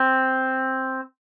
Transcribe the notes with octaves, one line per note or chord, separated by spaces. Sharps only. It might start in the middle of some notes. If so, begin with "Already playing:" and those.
Already playing: C4